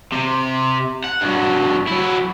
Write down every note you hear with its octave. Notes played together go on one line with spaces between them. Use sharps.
C3
F#5
G2 F#3
F#3 E4